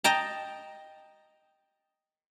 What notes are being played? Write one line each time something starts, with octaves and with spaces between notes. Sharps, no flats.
D#5 G5 A5 A#5